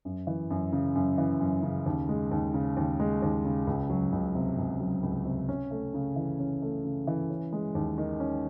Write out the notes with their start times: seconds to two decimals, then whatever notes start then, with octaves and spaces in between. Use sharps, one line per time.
0.05 F#2
0.27 E3
0.50 F#2
0.73 C#3
0.96 F#2
1.18 E3
1.41 F#2
1.63 C#3
1.86 D#2
2.09 G#3
2.31 D#2
2.54 C#3
2.77 D#2
3.00 G#3
3.22 D#2
3.45 C#3
3.67 C#2
3.90 F#3
4.12 C#2
4.35 C3
4.58 C#2
4.81 F#3
5.03 C#2
5.25 C3
5.49 C#4
5.71 A3
5.94 C#3
6.16 E3
6.39 C#4
6.62 A3
6.84 C#3
7.07 E3
7.30 C#4
7.53 G#3
7.75 D#2
7.98 D#3
8.20 C#4